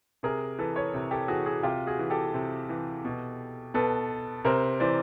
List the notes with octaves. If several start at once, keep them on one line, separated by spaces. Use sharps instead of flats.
C3 G#4 A#4
E3 A4 B4
B4 C#5
C3
G4 A4
E3 F#4 G#4
F#4 G#4
C3 F4 G4
F#4 G#4
E3
G4 A4
C3
E3
B2
B2 A4 B4
C3 A#4 C5
E3 C5 D5